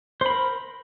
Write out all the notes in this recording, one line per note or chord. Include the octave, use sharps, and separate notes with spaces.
A#4 C5 B5